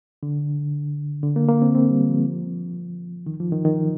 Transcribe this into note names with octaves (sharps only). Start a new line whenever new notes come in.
D3
D3
A#3
A#3
C4
C4
G3
F3
D#3
F3
D#3
D#3